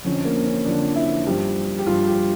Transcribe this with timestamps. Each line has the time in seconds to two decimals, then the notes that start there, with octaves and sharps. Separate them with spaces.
0.05 F2 D3 F3 C#4
0.25 A#3
0.46 C#4
0.65 F2 D3 F3 D4
0.96 E4
1.27 G2 F3 G4
1.79 G4
1.86 G2 F3 F4
2.07 G4